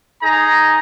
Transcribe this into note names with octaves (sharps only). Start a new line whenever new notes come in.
D#4 G#4 A#5